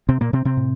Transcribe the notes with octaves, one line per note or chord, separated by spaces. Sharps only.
C3 C4
A#2 A#3
C3 C4
C3 C4
A2